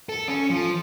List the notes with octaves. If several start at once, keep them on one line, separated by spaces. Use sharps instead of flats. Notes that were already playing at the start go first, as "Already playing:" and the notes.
A4
C#4
F3